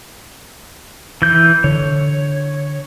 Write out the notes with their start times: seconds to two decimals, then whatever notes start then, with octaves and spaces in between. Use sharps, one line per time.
1.22 E3 G6
1.64 D3 C#5